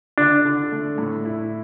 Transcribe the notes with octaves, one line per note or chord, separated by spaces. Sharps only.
D3 D4
D3
A3
A2
E4